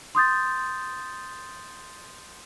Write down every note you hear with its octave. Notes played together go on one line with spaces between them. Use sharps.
C6 D#6 G6 A6